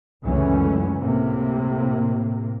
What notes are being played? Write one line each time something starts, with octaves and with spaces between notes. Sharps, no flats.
C#2 F#2 D3 E3 A3 C#4
A2 C3 A#3